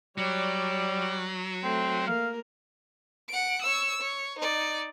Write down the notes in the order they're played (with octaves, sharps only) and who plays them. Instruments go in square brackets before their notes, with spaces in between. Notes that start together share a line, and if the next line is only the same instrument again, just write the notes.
[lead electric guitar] F#3 [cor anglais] G3 [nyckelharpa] C#5 D5
[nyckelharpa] A3 [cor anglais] C4
[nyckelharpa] A#3 A#4 [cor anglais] F5
[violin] F#5 D7
C#5 E6
C#5
D#4 D5